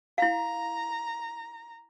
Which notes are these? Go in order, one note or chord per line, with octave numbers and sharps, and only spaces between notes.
E4 F5 A#5